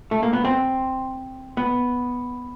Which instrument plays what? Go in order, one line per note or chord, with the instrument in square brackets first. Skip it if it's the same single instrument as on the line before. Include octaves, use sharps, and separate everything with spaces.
[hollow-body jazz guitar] A3
A#3
B3
C4
B3